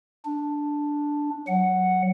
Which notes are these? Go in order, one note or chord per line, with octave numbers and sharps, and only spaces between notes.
D4
F#3 F#5